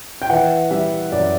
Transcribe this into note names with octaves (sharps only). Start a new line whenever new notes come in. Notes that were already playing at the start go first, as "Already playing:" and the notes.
G5
E3 F#5
G3 E5
F#2 D5